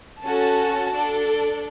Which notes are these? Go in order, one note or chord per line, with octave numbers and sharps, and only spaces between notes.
C#4 F#4 A4 A5
D4 A4